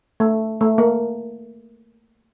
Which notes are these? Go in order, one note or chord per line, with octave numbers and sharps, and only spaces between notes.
A3
A3
A#3